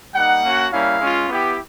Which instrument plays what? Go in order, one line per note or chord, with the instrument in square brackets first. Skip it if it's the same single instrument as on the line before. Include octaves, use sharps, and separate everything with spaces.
[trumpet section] G3 A#3 D#4 F#5
A#3 C#4 F#4
G3 A#3 C#4 E4 F5
G#3 C#4 F4
B3 E4 G4